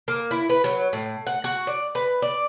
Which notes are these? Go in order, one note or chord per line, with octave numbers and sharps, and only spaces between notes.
A#3
E4
B4
F#3
A2
F#5
F#4
D5
B4
D5